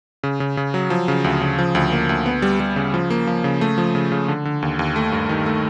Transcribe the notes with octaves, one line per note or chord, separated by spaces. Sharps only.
C#3
C#3
C#3
F#3
F3
C#3
D2
C#3
F3
D2
A#3
D2
B3
G3
G3
C#3
F3
A#3
F3
C#3
A3
F3
C#3
C#3
D3
D3
D#2
D#2
A3
G2
D#3
A3